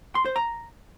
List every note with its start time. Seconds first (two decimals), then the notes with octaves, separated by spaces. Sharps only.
0.15 C6
0.25 C5
0.36 A#5